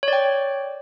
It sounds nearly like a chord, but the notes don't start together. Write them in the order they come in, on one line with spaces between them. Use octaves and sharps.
C#5 D5 G5